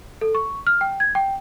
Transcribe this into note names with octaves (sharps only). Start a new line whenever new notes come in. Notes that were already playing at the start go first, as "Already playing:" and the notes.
A4
C#6
F6
G5
G#6
G5